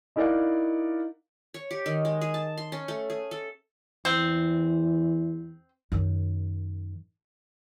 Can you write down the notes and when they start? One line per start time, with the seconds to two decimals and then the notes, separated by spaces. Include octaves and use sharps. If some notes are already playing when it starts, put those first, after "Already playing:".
0.16 D#4 E4 A#4 D5 F5 F#5
1.54 C#5
1.71 G4
1.86 D#3
2.05 G#3
2.21 G#4
2.34 A5
2.58 C6
2.72 C#4
2.88 A3
3.10 G#4
3.31 A4
4.05 E2 C4
5.92 F#2 D#3